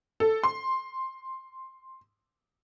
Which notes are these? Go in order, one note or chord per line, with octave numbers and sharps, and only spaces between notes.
A4
C6